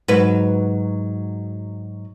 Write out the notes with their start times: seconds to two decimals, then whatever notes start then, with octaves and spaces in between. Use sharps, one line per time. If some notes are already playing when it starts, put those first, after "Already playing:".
0.08 G#2 F#3 B4